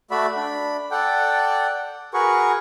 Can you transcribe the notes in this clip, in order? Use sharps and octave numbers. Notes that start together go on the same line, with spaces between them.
A3 F#4 D5 E5 B5
D4 B5
A4 D5 F#5 G5
F#4 G#4 A#4 B4 C#6